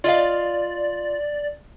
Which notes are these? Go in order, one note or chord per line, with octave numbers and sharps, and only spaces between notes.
F4 D5 D#5 F5